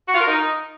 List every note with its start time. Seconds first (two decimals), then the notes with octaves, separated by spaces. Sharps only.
0.08 F#4
0.14 F4
0.21 A#4
0.27 D#4